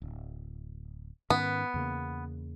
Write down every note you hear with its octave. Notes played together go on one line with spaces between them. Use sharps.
D1
G#2 D#3 B3 C#4
E2 C#3 A#3